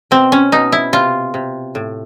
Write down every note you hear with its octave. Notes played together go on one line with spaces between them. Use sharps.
B2 C4
C#4
B2 D#4
E4
C3 F4
C3
A2